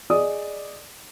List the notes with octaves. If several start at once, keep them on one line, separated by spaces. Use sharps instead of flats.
G#4 D5 D#5 D#6